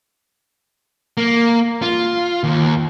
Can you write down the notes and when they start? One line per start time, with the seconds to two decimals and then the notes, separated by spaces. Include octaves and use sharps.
1.17 A#3
1.82 F4
2.44 D#2